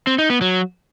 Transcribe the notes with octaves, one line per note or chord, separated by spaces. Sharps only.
C4
D#4
B3
F#3